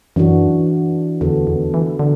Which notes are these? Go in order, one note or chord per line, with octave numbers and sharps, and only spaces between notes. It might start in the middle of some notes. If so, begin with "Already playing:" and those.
F#2 E3 D4 F#4
E2 D3 B3 F#4 A4
E2
E3
D3